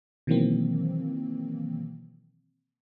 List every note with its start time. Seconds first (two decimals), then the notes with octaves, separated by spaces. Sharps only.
0.27 B2 D#3 E3 F#3 A#3 C4